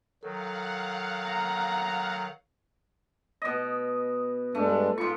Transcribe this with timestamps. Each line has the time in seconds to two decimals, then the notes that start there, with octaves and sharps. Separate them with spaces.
0.23 D#3 F#3 A4 F5 F#5
1.27 A#5
3.42 B2 D#5
4.55 G2 G#3 A3 D4
4.98 G#2 F4 C#6